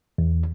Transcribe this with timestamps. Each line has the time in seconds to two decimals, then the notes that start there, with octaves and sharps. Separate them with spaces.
0.18 E2